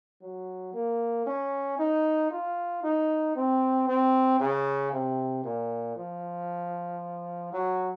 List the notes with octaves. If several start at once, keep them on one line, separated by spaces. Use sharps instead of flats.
F#3
A#3
C#4
D#4
F4
D#4
C4
C4
C#3
C3
A#2
F3
F#3